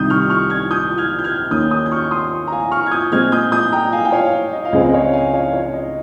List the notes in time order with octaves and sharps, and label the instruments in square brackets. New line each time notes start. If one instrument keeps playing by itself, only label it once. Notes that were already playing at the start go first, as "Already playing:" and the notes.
Already playing: [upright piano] C2 C3 D#3 D#6 G6
C#6 F6
C#6 F6
F6 G#6
D#6 G6
F6 G#6
G6
F6 G#6
D#2 D#3 A#3 C#4 D#6 G6
D#6 G6
G6
C#6 F6
C#6
C6 D#6
A#5
F5 G#5
C#6 F6
G#6
D#6 G6
A#2 G#3 C4 F6 G#6
D#6 G6
D#6 G6
G5 A#5
F5 G#5
G5
C#5 F5
D#5
F5
C#2 C#3 G#3 C4 D#5
C#5 F5
F5 G#5
C#5 F5
C#5
D#5